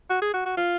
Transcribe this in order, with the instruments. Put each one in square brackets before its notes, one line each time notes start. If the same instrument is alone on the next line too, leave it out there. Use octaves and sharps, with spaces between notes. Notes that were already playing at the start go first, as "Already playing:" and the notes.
[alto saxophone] F#4
G#4
F#4
F#4
F4